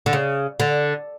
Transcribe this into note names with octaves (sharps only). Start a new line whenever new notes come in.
D3
C#3
D3